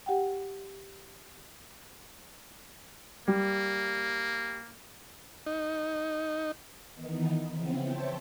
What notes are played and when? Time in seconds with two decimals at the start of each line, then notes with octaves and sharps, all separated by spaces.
0.06 G4 F#5 G5
3.28 G3 A#3
5.46 D#4
6.94 D#3 E3 B3 D#4
7.52 C#3 E3 F3 B3 C4
7.83 C5 C#5 E5 G5 A5 C6